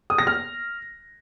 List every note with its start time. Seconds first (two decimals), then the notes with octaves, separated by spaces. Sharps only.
0.10 D#6
0.18 A#6
0.27 F6